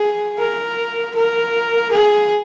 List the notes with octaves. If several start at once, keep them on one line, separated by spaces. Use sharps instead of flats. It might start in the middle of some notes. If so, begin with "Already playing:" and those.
Already playing: G#4
A#4
A#4
G#4